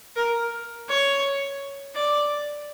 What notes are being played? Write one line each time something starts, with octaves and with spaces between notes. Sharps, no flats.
A#4
C#5
D5